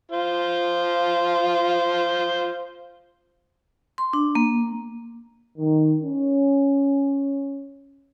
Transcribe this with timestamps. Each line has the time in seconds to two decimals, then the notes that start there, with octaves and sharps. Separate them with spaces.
0.12 F4 C5
3.98 C6
4.13 D4
4.35 A#3
5.58 D#3
6.02 C#4